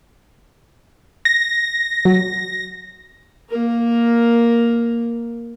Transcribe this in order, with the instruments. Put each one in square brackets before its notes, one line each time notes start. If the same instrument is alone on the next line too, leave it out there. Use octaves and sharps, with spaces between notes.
[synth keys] A#6
[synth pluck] F#3
[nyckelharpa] A#3 A#4